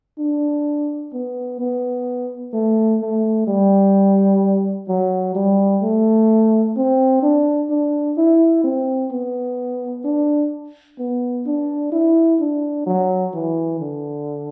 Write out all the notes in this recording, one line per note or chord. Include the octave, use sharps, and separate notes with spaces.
D4
B3
B3
A3
A3
G3
F#3
G3
A3
C4
D4
D4
E4
C4
B3
D4
B3
D4
E4
D4
F#3
E3
D3